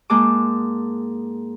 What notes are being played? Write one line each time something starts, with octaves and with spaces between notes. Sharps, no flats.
G#2 G#3 A#3 A5 D6